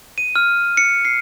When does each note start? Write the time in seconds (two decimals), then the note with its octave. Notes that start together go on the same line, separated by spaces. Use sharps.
0.18 D#7
0.36 F6
0.77 C#7
1.05 C7